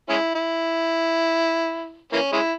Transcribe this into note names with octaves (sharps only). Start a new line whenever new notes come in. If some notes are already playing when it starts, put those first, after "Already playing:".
G#3 C#4 E4
E4
E3 A#3 C#4
G#3 C#4 E4